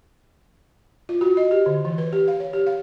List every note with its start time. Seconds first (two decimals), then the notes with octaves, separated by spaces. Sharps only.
1.09 F4
1.21 F#4
1.37 D#5
1.51 G4
1.66 D3
1.85 E3
1.98 B4
2.13 G4
2.28 F5
2.40 C#5
2.53 G4
2.67 F5